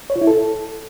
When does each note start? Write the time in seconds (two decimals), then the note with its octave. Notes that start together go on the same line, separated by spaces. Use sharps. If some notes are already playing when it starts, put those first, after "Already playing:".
0.10 C#5
0.16 F4
0.21 E4
0.27 A4